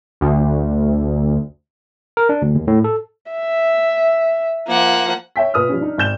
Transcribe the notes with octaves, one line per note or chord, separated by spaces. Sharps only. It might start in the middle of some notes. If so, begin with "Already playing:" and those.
D2
A#4
D4
D2
D#2
A2
A4
E5
F3 A#3 F#5
C#5 E5 G5 B6
A#2 B4 D#6 F6
F3 G3 C#4
D4 D#4
G#1 D5 G6 E7 G7